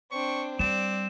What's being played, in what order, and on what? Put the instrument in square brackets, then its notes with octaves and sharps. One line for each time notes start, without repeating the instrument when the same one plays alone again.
[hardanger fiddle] C4 D4 [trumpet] C#6
[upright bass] G3 [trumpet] C4 [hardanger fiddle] D5 [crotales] E7